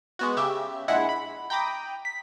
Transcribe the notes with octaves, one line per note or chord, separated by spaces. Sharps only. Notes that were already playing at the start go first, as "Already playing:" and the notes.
G#3 B3 F#4
C#3 G4 E5
A#1 G#3 E4 F#5
B5
G5 A#5 B5 D6 D#6
B6